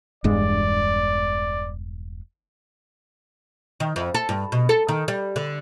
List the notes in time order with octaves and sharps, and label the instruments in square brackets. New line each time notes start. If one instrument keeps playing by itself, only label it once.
[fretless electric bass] E1 G2 G#3 [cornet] D5
[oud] D#3
F2
A4
G2
B2
A4
D#3
G3
D3